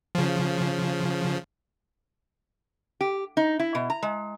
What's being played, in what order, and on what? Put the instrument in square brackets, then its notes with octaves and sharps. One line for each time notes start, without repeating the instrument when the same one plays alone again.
[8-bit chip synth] C#3 F3
[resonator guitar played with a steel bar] G4
D#4
E4
B2
A#5
G#3